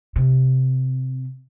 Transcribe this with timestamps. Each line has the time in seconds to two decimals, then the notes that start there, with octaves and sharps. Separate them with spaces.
0.16 C3